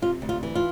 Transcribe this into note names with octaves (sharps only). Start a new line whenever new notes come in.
C3 F4
D2
F4
E3
F4